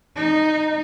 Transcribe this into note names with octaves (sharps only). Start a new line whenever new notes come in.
D#4